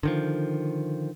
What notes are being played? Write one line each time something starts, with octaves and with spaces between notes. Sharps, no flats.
D3 D#3 F3